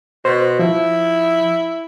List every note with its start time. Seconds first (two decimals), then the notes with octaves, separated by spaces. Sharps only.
0.25 B2 C5
0.59 F3 E4